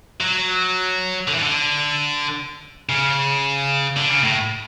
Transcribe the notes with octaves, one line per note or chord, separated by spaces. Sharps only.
F#3
D3
E3
D3
C#3
D3
C#3
A2